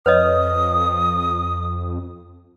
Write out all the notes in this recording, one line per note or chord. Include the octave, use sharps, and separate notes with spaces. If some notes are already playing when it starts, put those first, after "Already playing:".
F2 B4 C#5 D#5 D#6